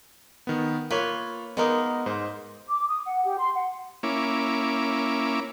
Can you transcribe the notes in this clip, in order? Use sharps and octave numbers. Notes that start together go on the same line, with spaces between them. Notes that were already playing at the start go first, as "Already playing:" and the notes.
D#3 B3
A#3 F4 B4 C#5
G#3 A#3 B3 D#4 A#4
G#2 C5
D6
D#6
F#5
G4
C6
F#5
A#3 C#4 E4 D6